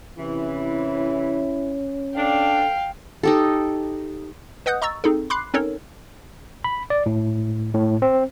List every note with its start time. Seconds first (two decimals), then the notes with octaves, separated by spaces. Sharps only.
0.18 C3 E3 C#4 E4
2.17 D4 A4 F5 G5
3.23 D#4 G4 A4
4.66 B4 D#5 F#5 D#6 F#6 G6
4.82 D#5 A#5 C#6 E6 A6
5.04 C4 D#4 G#4 A4
5.30 B5 C6 D6 F#6 C7
5.54 C4 C#4 D#4 A4 A#4 C#5
6.64 B5
6.90 D5
7.06 A2
7.74 A2
8.02 C4